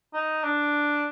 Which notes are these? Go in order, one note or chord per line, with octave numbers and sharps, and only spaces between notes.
D#4
D4